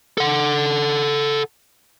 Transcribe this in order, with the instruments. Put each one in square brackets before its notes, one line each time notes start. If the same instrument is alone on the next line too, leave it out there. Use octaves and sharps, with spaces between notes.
[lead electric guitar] A4 F#5